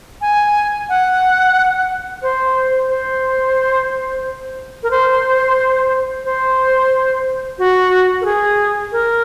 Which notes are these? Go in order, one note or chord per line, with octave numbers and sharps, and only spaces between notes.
G#5
F#5
C5
C5
A#4
C5
C5
F#4
A#4
G#4
A#4